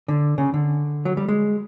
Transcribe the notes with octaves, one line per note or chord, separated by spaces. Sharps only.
D3
C#3
D3
F#3
G3
G#3